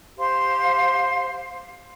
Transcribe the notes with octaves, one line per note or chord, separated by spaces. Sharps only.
G4 C5 F5 C6